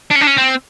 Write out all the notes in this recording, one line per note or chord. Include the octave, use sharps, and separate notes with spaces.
D4
C#4
D4
C#4
C4